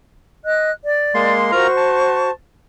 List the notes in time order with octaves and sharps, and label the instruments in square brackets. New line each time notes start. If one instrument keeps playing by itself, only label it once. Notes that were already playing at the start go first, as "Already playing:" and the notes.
[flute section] D#5 F#6
D5
[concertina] G#3 A#3 C6
[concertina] F4 A#4 A#5 [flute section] F#4 C5 C#6
[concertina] A5